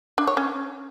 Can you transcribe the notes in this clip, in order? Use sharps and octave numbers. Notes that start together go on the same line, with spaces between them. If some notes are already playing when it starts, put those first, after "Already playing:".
D4
C#5
C#4